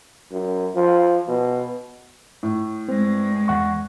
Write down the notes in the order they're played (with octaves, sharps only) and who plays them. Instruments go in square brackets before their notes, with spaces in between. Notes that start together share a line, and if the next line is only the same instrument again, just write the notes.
[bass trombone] F#2
F3
B2
[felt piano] A2
[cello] G2 G#3 [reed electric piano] C4
[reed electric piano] E2 F#5 C#6